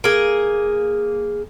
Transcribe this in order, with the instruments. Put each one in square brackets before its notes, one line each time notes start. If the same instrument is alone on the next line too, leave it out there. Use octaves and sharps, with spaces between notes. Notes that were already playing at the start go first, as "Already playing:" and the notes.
[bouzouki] A#3 G#4